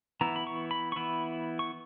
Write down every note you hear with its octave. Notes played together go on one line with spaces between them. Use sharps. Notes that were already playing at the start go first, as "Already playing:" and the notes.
E3 B3 E4 A#5
B5
C#6
B5
C#6
E3 B3 E4 B5
C#6